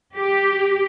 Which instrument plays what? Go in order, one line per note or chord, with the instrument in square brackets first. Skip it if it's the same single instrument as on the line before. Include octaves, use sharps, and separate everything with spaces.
[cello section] G4